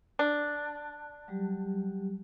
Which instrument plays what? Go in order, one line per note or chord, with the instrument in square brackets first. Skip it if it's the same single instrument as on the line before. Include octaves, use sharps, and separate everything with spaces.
[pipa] D4
[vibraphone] F#3 G3 G4